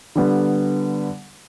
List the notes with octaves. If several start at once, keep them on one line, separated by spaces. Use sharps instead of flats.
D3 G3 B3